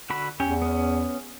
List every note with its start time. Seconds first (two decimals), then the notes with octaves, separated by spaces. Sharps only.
0.10 D3 F#4 B5
0.40 E2 C#4 G4
0.62 B3 C#4